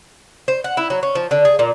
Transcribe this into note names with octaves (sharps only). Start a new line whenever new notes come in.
C5
F#5
E4
F#3
C#4
F3
D3
G#4
A#2